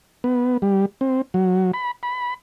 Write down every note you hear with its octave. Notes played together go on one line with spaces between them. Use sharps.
B3
G3
C4
F#3
B5
B5